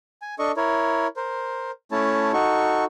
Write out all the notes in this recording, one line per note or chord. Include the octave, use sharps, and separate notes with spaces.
G#5
D4 A4 D#5 C#6
E4 A#4 C#5
A#4 C5
A3 C#4 E4 C#5 A5
D#4 F#4 A4 C#6